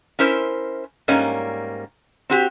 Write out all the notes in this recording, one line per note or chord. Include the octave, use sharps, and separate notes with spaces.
C#4 E4 A#4 C5
G#2 G3 A#3 C#4
C4 F#4 G4